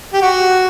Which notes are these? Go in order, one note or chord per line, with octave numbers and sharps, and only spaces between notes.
G4
F#4